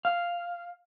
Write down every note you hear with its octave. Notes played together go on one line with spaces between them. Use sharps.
F5